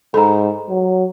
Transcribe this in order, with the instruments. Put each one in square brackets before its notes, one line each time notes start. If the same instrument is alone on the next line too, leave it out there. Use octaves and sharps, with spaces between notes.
[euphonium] G#2 [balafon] A4 [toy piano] A#5 B5
[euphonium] F#3